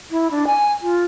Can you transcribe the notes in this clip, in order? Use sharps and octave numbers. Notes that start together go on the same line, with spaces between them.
E4
D4
G#5
F4